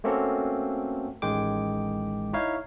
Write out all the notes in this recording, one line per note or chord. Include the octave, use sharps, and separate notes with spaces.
A3 A#3 C4 C#4 F#4 A4
A1 D#3 G#3 G5 D6
D#4 E4 C#5 F5